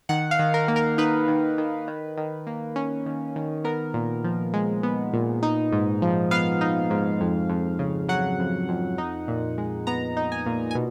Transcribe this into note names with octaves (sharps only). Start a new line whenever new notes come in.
D#3 F#5
F5
D#3
A#4
A#3
A#4
D#4 B4
D#3
D#3
D#3
D#3
A#3
C#4
D#3
D#3
B3 A#4
A#2
F3
G#3
B3
A#2
D#4
G#2
F3
B3 F5
D#4
G#2
F2
F2
C#3
F#3 F#5
F2
F2
D#4
A#2
G#3
B3 A#5
D#4
G#5
A#2
G#5
B2